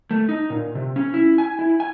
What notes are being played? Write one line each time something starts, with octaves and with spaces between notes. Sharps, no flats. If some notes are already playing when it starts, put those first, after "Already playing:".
A3
D#4
A#2
C3
C#4
E4
G#5
E4
G#5